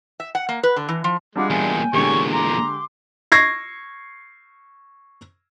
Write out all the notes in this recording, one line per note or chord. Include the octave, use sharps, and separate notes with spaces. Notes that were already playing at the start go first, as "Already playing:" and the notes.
E5
F#5
A#3
B4
D3
E3
F3
G3 G#3 D4 F4 F#5 D6
E2 A#2 G5 G#5
E2 A#2 D3 G#3 G4 C#5 C#6
A#5 C6 D6
C#6 G#6 A#6 C7